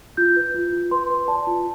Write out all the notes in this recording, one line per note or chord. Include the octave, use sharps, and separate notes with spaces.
F4 G6
B4
F4
F4
B4 C6
B4
D5 A5
F4